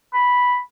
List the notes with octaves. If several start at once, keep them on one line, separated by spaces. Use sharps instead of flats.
B5